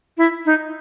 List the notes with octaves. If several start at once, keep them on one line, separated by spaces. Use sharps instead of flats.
E4
D#4